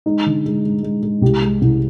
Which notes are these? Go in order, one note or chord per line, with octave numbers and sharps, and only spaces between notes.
G#3 D#4
D3
G#3
G#3
G#3
G#3
C2 G4
G#3
C2